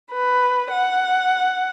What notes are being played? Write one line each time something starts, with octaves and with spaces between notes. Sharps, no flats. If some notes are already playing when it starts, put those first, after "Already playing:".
B4
F#5